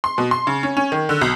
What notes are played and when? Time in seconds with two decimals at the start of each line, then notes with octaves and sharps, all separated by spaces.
0.04 C6
0.18 B2
0.31 C6
0.47 C#3
0.63 C#4
0.77 C#4
0.92 D#3
1.09 D3
1.21 B1